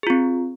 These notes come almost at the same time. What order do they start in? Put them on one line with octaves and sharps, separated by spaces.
G#4 F4 C4